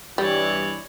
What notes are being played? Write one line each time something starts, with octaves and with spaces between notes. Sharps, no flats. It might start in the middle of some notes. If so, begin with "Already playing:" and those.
G2 B2 E3 G3 C#5 D5